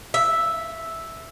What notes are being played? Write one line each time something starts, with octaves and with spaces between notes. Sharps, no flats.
E5